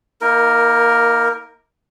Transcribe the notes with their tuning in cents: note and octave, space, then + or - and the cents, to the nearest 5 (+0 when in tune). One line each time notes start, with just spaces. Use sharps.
A#3 +15 D#4 +45 A#4 +0